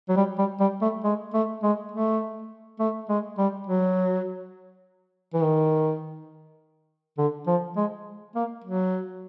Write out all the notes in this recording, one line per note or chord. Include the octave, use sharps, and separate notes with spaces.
F#3
G3
G3
G3
A3
G#3
A3
G#3
A3
A3
G#3
G3
F#3
E3
D#3
D3
F3
G#3
A#3
F#3